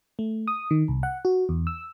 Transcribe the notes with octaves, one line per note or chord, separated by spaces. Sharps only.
A3
D#6
D#3
C2
F#5
F#4
E2
E6